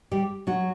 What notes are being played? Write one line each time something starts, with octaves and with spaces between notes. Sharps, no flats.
G3 G4
F#3 F#4